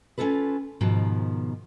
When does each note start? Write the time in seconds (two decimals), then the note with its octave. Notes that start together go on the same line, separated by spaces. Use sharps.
0.18 C#4 D#4 F4 A4 B4
0.81 G#2 B2 D#3 F3